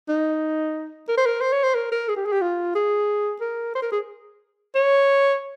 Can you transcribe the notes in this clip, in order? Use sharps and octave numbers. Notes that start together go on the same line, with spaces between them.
D#4
A#4
C5
A#4
C5
C#5
C5
A#4
A#4
G#4
G4
G#4
G4
F4
G#4
A#4
C5
A#4
G#4
C#5